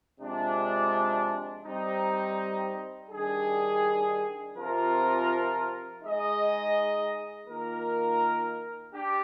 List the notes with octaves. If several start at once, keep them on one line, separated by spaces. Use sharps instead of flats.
C3 F3 G#3 D4
G3 C4 D#4
D#3 G3 D4 G#4
C3 F3 C4 F4 A#4
G#3 D#4 G#4 D#5
D#3 A#3 F4 A#4
D4 G4